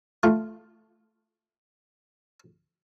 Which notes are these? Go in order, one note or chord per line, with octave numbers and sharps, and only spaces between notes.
A3 F4